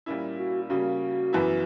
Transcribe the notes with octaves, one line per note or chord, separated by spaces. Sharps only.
A#2 G3 A#3 C#4 E4
F#4
C#3 G3 A#3 C#4 F#4
F#2 E3 B3 E4